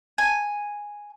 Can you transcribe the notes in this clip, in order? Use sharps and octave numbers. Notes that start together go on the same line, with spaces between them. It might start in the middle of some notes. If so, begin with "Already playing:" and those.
G#5